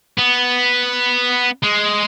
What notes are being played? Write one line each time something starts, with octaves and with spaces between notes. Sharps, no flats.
B3
G#3